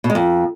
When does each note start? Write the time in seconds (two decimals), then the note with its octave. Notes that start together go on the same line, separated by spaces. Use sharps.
0.04 B2
0.10 G#3
0.15 F2